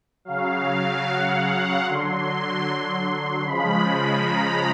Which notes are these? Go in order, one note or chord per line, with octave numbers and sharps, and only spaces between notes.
C#3 F#3 F5
F#5
D3 F#3 C6
C#3 F3 G#3 B5
B5
A#5